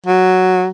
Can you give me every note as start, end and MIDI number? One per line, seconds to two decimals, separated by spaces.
0.06 0.67 54